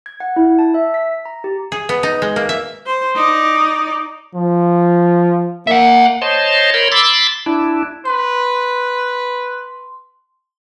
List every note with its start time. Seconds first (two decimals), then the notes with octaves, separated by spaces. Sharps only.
0.06 G#6
0.20 F#5
0.36 E4
0.59 A5
0.74 E5
0.94 B6
1.26 A#5
1.44 G4
1.72 G#4
1.89 B3
2.03 D#4
2.22 G#3
2.36 A#3
2.49 E5
2.86 C5
3.15 D#4 D5
4.35 F3
5.67 A#3 E5 F#5
6.22 C5 C#5 D#5 A5 C6
6.74 A#4 C#5 B5 C6
6.92 B5 C6 D6 E6 A6
7.46 D4 E4
8.05 B4 C6